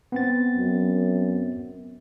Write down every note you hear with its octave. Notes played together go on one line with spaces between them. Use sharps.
B3 C4 A6
F#2